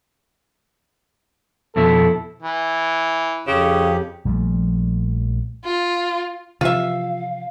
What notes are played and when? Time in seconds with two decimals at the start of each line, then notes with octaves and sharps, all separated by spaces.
1.76 F2 B2 E4 A4
2.42 E3
3.47 F2 C#3 G4
4.25 A#1 F3 G3 A3
5.64 F4
6.61 C3 E3 F3 F4 E5 F5